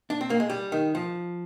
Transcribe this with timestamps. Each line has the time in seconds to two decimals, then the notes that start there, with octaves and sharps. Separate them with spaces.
0.10 D4
0.21 C4
0.30 A#3
0.40 G#3
0.50 G3
0.72 D#3
0.95 F3